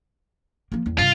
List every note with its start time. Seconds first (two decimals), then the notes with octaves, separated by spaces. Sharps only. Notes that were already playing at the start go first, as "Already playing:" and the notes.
0.72 F3 A#3
0.86 E2
0.98 G2 C3 F4